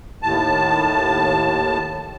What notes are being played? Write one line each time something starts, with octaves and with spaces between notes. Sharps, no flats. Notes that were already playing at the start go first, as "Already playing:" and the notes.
D#2 A2 A5